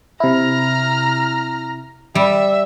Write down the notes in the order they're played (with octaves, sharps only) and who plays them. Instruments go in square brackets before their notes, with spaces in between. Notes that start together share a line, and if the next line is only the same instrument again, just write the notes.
[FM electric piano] C3 E4 [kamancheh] A#5 F6
[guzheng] G3 [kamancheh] E5